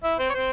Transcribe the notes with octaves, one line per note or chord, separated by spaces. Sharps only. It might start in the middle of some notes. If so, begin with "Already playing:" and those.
E4 E5
C4 C5
C#5
C4 C5